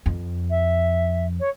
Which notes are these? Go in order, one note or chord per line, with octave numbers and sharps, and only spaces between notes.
F2
E5
C#5